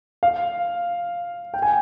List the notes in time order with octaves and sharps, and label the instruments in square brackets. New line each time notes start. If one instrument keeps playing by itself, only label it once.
[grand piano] F5
G5
G#5